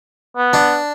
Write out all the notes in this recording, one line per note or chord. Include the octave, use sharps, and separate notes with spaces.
B3
D4